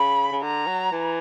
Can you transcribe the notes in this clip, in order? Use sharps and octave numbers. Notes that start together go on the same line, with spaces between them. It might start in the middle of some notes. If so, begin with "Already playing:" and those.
Already playing: C#3 B5
C#3
D3 A#5
F#3
E3